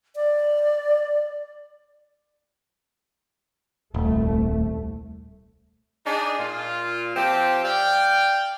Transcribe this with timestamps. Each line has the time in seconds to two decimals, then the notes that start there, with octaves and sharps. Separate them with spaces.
0.16 D5
3.94 D#1 C2 A3
6.06 D4 D#4 G#4
6.39 A#2 F4
7.14 F3 C4 G4
7.63 D5 F5 G5